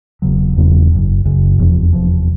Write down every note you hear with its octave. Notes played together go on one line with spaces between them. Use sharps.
E1 E2 C#3 F#3
E1 E2 C#3 F#3
F#1 F#2 C#3
F#1 F#2 C#3
F1 E2 C3 F3
F1 E2 C3 F3